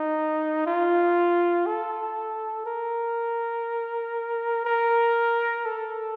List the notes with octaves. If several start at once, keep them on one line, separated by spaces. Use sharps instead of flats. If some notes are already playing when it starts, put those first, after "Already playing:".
Already playing: D#4
F4
A4
A#4
A#4
A4